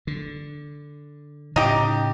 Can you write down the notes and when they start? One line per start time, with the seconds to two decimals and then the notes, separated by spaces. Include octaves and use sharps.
0.07 D3
1.56 A2 C#3 D#4 G4